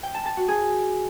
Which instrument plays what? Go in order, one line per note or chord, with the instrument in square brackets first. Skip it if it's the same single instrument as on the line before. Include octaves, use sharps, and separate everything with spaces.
[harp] G5
A5
A5
F#4
G#4